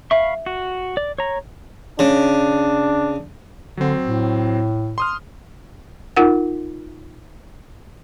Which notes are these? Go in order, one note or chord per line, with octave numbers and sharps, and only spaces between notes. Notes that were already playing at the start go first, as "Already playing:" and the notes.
E5 F5 B5 C#6
F#4
D5
C#5 A#5
C#3 D4
D3 F#3 C4
A2
C6 D#6 F6
D#4 F4 A#4 F#5